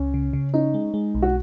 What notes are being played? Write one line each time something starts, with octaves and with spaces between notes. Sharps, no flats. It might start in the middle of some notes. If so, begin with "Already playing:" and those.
Already playing: C#2 C#4
C#3
C#3
C#4 D#4
G#3
G#3
B1
F#4